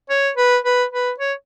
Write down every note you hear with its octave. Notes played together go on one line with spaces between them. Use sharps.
C#5
B4
B4
B4
C#5